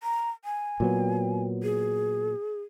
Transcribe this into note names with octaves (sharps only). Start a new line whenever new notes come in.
A#5
G#5
A#2 F#3 B3
G#4